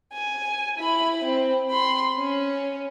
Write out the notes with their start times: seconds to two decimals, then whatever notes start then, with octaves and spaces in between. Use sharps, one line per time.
0.13 G#5
0.78 E4 B5
1.24 C4
1.70 B5 C6
2.19 C#4